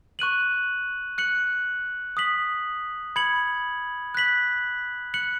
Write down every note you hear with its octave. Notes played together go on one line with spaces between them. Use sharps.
C#6 F#6 D#7 F#7
F#6 C#7 F#7
D#6 B6 F#7
B5 G#6 C#7 F#7
F#6 B6 F#7
F#6 C#7 F#7